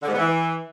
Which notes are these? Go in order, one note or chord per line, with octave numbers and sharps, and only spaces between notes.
D3
G#2
B3
E3